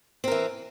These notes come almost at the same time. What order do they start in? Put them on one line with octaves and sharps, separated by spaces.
C4 A#4 E3